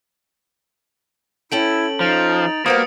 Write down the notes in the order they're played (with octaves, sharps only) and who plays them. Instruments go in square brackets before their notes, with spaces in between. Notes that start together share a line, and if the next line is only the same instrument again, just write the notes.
[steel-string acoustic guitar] C#4 A4 G5 [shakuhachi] E4 [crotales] D7 F#7
[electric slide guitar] F3 [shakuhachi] D#4 [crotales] A6 D7 F7
[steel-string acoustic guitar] G3 B3 F#4 [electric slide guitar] A#3 [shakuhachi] C5 [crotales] D#6 C#7